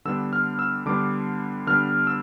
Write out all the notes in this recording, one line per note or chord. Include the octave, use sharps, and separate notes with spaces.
D3 G3 B3 D4 E6
F6
E6
D3 G3 B3 D4 D6
D3 G3 B3 D4 F6
E6